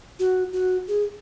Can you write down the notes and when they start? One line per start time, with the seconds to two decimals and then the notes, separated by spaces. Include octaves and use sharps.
0.20 F#4
0.53 F#4
0.88 G#4